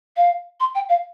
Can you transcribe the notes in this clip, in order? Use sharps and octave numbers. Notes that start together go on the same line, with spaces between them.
F5
C6
G5
F5